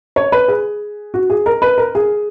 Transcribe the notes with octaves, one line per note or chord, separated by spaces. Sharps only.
C#5
B4
G#4
F#4
G#4
A#4
B4
A#4
G#4